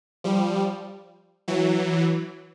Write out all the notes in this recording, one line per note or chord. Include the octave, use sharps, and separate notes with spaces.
F3 G3
E3 F#3